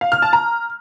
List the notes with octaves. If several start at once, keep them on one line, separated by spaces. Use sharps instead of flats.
F5
F6
A5
A#5